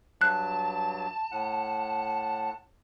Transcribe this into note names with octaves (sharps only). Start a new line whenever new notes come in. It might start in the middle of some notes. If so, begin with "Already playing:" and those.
G2 F#3 A5 F#6
A2 F#5